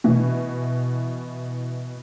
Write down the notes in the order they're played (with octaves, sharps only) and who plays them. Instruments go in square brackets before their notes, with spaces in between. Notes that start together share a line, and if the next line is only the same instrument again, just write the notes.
[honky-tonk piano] B2 E3